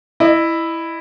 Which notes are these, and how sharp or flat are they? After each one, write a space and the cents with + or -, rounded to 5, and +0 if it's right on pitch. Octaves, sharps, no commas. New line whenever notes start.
E4 +0 D#5 -25